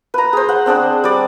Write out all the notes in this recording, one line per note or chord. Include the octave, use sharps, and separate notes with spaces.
B4 A#5
G#4 C5
F#5
C4 D4 G#4 C5
G3 D5